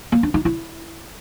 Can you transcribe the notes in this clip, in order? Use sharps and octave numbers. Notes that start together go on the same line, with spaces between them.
A#3
D4
D#4
E4